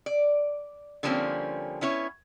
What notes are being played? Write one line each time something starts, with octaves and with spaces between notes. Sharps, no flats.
D5
D3 F3 G3 A#3 C4 C#4
B3 C#4 E4 C#5